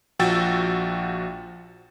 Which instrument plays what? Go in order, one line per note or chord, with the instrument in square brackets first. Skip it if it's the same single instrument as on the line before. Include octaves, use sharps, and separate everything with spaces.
[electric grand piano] A#1 F3 F#4 G5 E6 A6